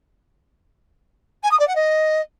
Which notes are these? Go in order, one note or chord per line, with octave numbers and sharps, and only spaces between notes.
G#5
D#6
D5
F#5
D#5